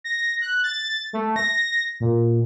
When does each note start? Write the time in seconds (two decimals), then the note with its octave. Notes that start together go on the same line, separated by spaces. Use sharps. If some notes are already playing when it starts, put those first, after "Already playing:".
0.04 A#6
0.42 F#6
0.64 A6
1.13 A3
1.36 A#6
2.00 A#2